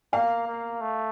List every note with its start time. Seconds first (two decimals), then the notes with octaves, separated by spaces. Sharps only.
0.13 A#3 F5
0.47 A#3
0.81 A3